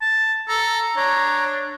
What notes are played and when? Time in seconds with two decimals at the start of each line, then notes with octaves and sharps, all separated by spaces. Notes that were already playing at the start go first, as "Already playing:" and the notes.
0.01 A5
0.48 A4 A#5
0.96 D4 C#5 A#5